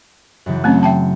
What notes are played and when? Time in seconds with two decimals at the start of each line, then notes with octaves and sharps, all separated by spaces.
0.46 F#2 C#3 E3
0.64 A3 C4 C#4
0.83 E5 G5 A5